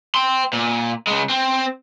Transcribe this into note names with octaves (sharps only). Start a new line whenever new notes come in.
G5 C6
A#2
C#3 G#3
C4